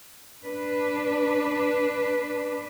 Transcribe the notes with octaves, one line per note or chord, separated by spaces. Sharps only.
D4 B4